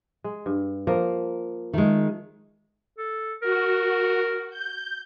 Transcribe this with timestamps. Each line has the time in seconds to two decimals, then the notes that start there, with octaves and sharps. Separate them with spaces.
0.24 G#3
0.46 G2
0.87 F3 A#3 A#4
1.73 D#3 G#3 A3
2.98 A4
3.42 F#4 A#4
4.50 G6